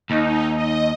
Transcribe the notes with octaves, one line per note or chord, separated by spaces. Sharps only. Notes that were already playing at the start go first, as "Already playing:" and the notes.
D#2 D#4
D#5